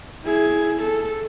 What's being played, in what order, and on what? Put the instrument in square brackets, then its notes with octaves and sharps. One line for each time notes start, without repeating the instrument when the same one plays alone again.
[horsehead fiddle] E4 G#4
A4